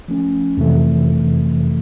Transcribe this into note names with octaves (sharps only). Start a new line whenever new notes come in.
F3 A3 C#4
F2 C3 E3 A3